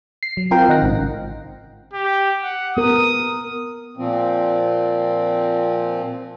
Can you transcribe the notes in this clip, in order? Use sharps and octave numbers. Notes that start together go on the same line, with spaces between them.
C7
F#3
C4 F4 A#4 F5 G5
D#3 D#4 F#5 A#6
A1 G#2 C#3
G4
F#5
B3 A#4 D#6
A#2 F3 C4